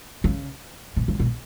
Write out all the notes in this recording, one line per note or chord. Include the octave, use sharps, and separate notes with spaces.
C#3
B2
C#3
B2